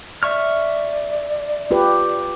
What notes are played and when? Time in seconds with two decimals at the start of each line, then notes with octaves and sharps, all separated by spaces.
0.23 D5 E5 C#6 F6
1.71 F4 G4 B4